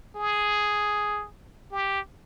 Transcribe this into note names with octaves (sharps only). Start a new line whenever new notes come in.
G#4
G4